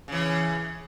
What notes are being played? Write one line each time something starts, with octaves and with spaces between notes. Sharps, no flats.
C#3 E3